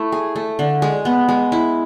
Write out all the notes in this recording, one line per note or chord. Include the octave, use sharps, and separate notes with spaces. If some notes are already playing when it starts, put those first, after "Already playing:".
Already playing: A3 E4
G#4
A3
D3
G#3
B3
G#3
E4